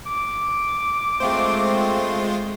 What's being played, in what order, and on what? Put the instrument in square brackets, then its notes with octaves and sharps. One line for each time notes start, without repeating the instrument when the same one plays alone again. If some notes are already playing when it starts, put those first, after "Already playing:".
[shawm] D6
[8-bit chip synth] G#3 F4 C5 [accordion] A3 C4